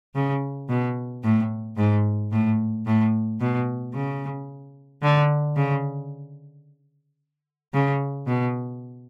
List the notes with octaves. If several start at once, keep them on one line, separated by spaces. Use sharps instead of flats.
C#3
B2
A2
G#2
A2
A2
B2
C#3
D3
C#3
C#3
B2